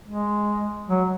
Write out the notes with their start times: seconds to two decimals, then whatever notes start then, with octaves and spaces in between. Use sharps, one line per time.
0.07 G#3
0.89 F#3